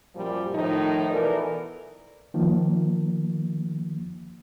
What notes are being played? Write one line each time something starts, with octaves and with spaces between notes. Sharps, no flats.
F#2 A#2 F3 G3
A2 D#3 F3 D#4
B2 E3 A4 A#4 D5
D#3 F3 A#3